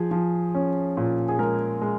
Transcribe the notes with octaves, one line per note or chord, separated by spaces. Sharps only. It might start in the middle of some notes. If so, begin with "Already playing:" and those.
Already playing: F3 G#4
F3
C#4
A#2
G#4
G#3 A#4
G#3